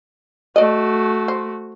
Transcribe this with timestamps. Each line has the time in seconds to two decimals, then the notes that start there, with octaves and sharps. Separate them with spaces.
0.56 A3 F#4 D5 D#5
1.28 C5